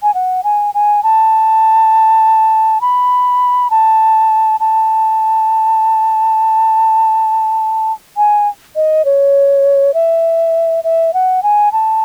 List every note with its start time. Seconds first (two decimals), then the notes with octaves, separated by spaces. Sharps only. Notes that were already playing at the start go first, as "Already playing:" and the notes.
0.03 G#5
0.14 F#5
0.44 G#5
0.74 G#5
1.03 A5
2.81 B5
3.70 A5
4.60 A5
8.17 G#5
8.76 D#5
9.05 C#5
9.94 E5
10.84 E5
11.14 F#5
11.43 G#5
11.72 A5